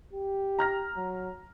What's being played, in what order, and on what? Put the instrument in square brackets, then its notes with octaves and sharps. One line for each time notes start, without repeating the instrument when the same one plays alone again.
[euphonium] G4
[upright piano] A#5 F6 A#6
[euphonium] F#3